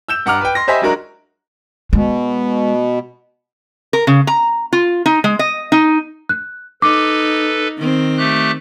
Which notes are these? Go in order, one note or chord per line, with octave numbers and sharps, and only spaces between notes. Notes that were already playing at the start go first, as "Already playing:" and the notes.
E6 G6 E7
G2 F#5 A#5 D6 F6
B4 G5
C6 A#6
G4 C5 D#5 E5 G#5 B5
F#3 G#3 D4 F#4 A#4
B2 G#3
A#4
C#3
A#5
F4
D#4
G#3
D#5
D#4
F#6
D#4 A4 B4 D6
D#3 C4
A3 G4 F#6